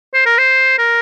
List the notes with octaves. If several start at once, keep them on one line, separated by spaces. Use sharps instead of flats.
C5
A#4
C5
A#4